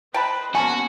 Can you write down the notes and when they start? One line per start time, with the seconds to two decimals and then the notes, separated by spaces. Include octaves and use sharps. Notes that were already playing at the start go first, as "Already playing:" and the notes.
0.14 B4 C5 D#5 G5 A5 B5
0.55 D3 A#3 B3 C#4 F#4 G#5 A5